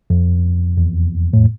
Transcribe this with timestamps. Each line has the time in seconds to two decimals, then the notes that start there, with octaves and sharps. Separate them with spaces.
0.10 F2
0.77 E2
1.33 A2